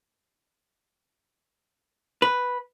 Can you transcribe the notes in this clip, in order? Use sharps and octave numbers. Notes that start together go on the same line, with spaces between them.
B4